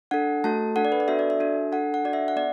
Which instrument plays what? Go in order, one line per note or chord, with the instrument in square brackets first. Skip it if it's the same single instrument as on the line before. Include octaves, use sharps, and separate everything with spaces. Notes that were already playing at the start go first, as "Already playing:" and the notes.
[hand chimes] D4 A4 F#5
A3 F#4 A4 A5
D4 A4 F#5
D5
B4
D5
B3 D4 F#4 A4 E5
D5
E5
D4 F#4 A4
D4 A4 F#5
F#5
D4 F#4 A4 D5
E5
F#5
B3 D5